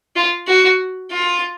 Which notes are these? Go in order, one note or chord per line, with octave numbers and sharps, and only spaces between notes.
F4
F#4
F4